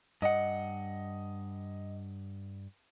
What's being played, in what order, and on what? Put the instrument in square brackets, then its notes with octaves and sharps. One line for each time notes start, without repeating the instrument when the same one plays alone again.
[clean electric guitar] G2 F#5 [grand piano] D#5